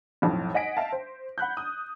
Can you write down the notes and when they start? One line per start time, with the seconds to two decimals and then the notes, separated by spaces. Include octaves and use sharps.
0.22 B1 F2 A2
0.54 D#5 F#5 G#5 A#6 B6 D7
0.77 E5 F5 G5 A5
0.92 C5
1.38 F#5 B5 F#6 G6
1.57 D#6